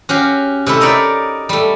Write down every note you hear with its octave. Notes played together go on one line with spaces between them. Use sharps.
C#4 F#4 G4 F5
C3 A3 E4
D#4 A#4 C#5 D5 B5
G3 A3